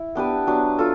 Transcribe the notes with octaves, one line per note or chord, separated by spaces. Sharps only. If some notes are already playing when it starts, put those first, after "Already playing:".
Already playing: E4
B3 D4 G4 B4
F#3 B3 D4
F4 A4